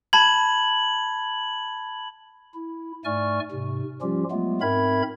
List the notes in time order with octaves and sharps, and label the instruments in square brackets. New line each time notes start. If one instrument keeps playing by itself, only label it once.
[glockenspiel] A5 B5 G#6 [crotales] F#7
[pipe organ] E4
G#2 A3 D5 G#5 C#6 F6
G#2 C3
F3 G3 C#4 F4 G4
F#3 G#3 A3 B3 F4
G#2 C4 A#4 E5 B5 G#6